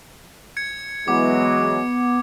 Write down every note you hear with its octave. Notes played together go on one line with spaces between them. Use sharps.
G#6 C#7
E3 F#3 G#3 B3 D6